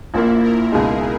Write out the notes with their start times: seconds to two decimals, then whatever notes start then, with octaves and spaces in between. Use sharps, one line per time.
0.13 A#1 A#2 A#3 E4
0.43 A#4
0.72 C#2 B2 G#3 D#4 G#4